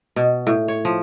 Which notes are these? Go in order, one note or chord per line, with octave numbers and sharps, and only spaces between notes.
B2
A2
C#5
F3